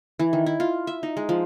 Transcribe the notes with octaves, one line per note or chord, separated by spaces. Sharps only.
E3
D#3
E4
F4
E5
D#4
G#3
F3